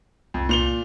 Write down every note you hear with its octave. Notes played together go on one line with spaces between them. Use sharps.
C2 F2
A#2 F7 G7